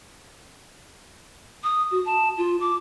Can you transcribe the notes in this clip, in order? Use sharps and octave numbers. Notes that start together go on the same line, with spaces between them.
D#6
F#4
A5
F4
D6